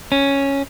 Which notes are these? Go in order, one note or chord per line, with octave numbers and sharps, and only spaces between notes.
C#4